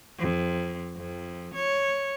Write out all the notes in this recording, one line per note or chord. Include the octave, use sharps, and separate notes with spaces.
F2
F2
C#5